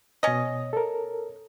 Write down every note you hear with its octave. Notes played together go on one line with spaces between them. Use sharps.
B2 C#4 D#5 D#6
A4 A#4